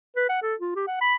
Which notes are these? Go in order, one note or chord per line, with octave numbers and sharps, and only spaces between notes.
B4
F#5
A4
F4
G4
F#5
B5